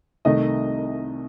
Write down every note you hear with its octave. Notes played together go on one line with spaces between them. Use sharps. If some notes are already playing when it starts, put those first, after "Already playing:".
C2 C3 D#3 A3 D#5